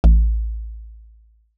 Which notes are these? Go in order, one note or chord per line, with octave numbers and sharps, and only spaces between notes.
A1